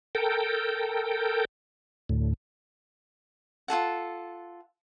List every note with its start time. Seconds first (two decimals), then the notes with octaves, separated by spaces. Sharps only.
0.15 A4 A#4 G5
2.09 D2 A2
3.68 F4 G#4 A4 F#5